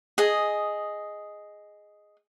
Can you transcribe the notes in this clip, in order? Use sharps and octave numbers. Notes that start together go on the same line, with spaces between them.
G#4 D#5